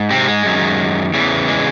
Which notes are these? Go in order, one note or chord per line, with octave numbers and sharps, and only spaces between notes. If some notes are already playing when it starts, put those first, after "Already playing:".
Already playing: G#2
C3 C4
G#3
F#2 D#3
E2 C#3 E3
G#3